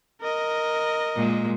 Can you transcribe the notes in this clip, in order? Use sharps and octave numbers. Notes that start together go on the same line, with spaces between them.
A#4 D#5
A#2 G#3